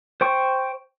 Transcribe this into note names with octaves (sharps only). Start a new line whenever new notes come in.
C5 G5 C#6